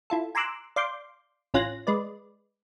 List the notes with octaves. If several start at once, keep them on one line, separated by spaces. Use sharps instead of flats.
E4 F4 A4
G#5 A#5 C6 D6 E6 F#6
D5 F5 C6 D6 G6
A1 C#4 F4 F#6 A#6
G#3 B4 D5